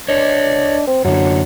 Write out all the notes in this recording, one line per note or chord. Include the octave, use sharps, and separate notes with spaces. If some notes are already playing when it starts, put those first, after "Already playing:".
D4 C#5 D#5
C4
F#2 D3 F#3